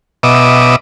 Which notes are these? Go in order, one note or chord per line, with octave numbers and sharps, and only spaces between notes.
B2 D#5 E5 D6